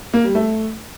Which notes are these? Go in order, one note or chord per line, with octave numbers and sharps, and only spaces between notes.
A#3
G3
A3